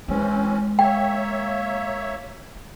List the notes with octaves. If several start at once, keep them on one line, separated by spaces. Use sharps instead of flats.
E3 G#3 C4 C#4
A#3 C#5 E5 G5